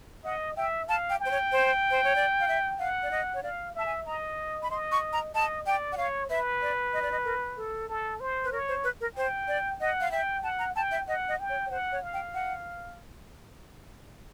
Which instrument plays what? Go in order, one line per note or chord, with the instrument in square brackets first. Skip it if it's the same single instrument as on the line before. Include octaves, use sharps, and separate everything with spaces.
[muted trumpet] D#5 [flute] F#5
[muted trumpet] E5 [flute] G5
[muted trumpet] F5 [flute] A5
[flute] G5
[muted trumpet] G5
[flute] C5
C#5
C5
C5
C#5
D5
F5
E5
[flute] F5 [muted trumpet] F#5
[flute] D5
D#5
C#5
[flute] D5 [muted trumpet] F5
[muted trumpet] E5 [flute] A5
[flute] G#5
[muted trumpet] D#5 [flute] A#5
[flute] B5
[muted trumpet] D#5 [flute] C6
[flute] C#6
A#5
[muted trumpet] D#5 [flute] A5
[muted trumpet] D5 [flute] G5
[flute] F#5
[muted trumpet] C#5 [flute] F5
[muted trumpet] B4 [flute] E5
[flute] D5
D#5
D5
D#5
A#4
A4
[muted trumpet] A4
C5
[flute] B4
[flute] A#4 [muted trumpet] C#5
[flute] C5
B4
A#4
[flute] C5 [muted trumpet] G5
[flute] D5
[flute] D#5 [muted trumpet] F#5
[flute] F5
[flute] E5 [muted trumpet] G5
[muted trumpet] F#5 [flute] A5
[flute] A#5
[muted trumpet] G5 [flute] A5
[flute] E5
[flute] D#5 [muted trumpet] F#5
[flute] D#5
[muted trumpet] G5
[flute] C#5
C#5
[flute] C5 [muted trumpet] F#5
[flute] C#5
[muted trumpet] F5
[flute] G5
F#5